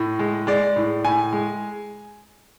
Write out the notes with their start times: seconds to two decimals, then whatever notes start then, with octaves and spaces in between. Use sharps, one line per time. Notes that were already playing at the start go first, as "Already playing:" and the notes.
Already playing: A2
0.19 G#3
0.47 G#3 D5
0.76 A2
1.04 A2 G#5
1.33 G#3